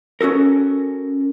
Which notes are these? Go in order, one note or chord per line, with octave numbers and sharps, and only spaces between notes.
C#4 F#4 A4 A#4